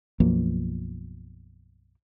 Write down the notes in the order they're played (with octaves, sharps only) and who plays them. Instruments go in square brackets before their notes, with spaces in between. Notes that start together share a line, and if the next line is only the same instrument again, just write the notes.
[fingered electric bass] B1 F#2 F3 A#3